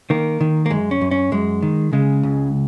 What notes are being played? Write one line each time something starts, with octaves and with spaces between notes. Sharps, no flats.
D#3 A#3
D#3
A#3
F#2 G#3
C#4
F#2
C#4
F#2 G#3
D#3
C#3 G#3
C#2